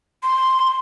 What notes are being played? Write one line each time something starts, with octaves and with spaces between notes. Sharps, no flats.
C6